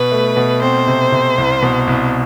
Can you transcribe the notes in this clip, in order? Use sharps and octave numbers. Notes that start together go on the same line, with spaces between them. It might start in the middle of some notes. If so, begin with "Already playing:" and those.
Already playing: B2 B4
A3
B2
C4 C5
C3
C3
C2
B2
C2